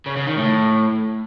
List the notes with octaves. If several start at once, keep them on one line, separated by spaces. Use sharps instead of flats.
C#3
C#3
D#3
A2